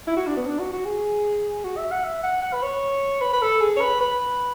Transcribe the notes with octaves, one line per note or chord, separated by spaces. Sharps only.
E4
F#4
D4
B3
D4
F#4
F#4
G#4
F#4
E5
F#5
E5
F#5
F#5
B4
C#5
B4
B4
A4
G#4
C#5
B4
B4